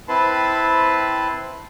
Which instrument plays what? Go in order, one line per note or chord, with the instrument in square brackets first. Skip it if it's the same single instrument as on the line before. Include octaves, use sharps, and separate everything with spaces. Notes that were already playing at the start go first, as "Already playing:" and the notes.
[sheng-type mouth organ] C4 E4 B4 A5 B5 C6